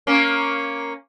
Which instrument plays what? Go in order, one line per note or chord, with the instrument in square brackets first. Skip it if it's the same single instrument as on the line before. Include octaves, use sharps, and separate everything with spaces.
[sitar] A#3 C#4